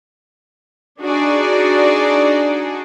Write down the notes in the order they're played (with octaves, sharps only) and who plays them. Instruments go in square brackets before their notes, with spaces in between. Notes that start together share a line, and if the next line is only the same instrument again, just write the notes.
[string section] D4 D#4 F#4 G#4 D5